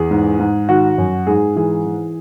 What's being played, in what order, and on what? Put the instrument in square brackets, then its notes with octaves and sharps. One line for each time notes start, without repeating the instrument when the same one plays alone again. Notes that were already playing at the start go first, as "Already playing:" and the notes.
Already playing: [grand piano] E2 G#4
G#2
G#2
D#3 F#4
F#2
G#2 G#4
E3 G#4
E3